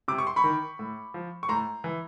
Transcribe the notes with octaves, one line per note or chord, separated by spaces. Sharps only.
C3 D6
C#6
C6
B5 C#6
D#3
A2
F3
C#6
A2 A#5 C6
E3